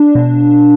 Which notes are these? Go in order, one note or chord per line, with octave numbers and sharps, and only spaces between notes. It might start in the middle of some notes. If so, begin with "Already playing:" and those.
Already playing: D4
B2